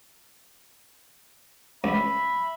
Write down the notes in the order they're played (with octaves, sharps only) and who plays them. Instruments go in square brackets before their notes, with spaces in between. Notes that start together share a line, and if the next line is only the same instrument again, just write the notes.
[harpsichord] C#2 [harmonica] E5 B5